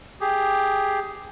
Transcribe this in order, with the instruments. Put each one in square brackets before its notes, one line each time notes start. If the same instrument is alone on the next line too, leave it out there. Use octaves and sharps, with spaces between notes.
[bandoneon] G4 G#4